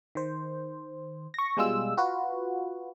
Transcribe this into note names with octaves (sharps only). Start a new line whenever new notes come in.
D#3 C5
C#6 A#6
B2 G3 G#3 F4 E6
F4 F#4 B4